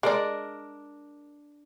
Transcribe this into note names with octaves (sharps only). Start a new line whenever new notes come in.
G#3 D4 A#4 D5